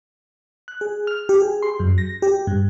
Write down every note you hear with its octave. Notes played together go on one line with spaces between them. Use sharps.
F#6
G#4
F6
G4
G#4
C6
F#2
A#6
G4
G2